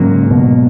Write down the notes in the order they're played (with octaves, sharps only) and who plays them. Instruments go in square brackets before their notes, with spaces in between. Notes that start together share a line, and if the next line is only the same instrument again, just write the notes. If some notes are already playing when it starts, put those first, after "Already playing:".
Already playing: [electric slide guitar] G#2 F#3 A#3 [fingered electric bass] C#3
[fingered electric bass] B2